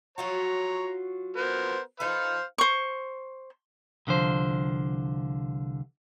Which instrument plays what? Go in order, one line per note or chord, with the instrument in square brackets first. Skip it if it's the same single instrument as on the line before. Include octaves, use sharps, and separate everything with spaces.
[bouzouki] F#3 F4 F#4 [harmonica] C#5 A#5
[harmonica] B3 A#4 C5
[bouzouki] D#4 A4 B4 [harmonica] C5 F5
[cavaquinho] C5 C#6
[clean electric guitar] C2 D3 F3 C5